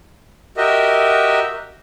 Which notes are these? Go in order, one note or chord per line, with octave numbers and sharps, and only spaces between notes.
F#4 G4 A#4 D#5 E5